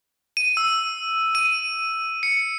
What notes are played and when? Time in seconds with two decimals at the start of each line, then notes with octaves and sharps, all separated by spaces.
0.37 D#7
0.57 E6
1.35 D#7
2.23 C#7